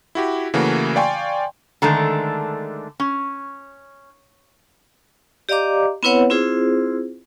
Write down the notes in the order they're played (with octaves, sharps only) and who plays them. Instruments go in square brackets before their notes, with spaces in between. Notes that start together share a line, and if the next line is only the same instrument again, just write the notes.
[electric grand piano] E4 F#4 G4
C#3 E3 A3 A#3 F#4
D5 F5 G5 G#5 C6 C#6
[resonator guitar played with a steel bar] D3 D#3 G#3 A3 D4
C#4
[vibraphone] G4 D5 D#5 F5 A#5 D6
B3 C4 E4 B4 C#5 F#5
C4 E4 F4 G#4 C5